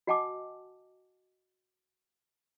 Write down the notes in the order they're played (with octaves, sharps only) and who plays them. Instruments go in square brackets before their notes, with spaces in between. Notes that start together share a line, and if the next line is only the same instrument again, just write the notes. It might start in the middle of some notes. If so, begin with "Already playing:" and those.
[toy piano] F#4 D#5 F#5 G#5 A5 D6